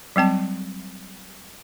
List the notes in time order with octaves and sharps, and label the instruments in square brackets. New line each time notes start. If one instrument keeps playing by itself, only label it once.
[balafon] F#3 G3 C4 A5